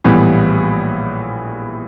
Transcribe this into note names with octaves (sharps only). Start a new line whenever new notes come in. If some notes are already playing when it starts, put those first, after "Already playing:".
A#1 A2 E3 G3 B3